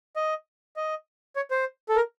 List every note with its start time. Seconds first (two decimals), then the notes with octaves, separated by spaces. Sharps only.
0.16 D#5
0.76 D#5
1.36 C#5
1.51 C5
1.89 A4
1.96 A#4